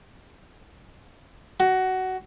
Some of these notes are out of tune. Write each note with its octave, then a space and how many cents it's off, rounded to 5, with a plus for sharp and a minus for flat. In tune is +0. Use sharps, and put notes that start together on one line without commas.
F#4 +15